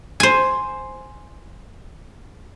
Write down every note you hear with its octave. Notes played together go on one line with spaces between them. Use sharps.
C5 G#5